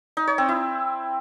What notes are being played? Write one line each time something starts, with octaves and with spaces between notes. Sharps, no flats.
D#4
C#5
C4
E4